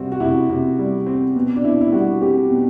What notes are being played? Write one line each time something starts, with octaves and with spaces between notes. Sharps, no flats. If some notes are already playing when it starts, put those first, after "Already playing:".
Already playing: C3 G3 C4 F#4
F#4
C3 E4
C3
G3
C4
B2
D4
B2 E4
E4
G3 F#4
C4 G4
B2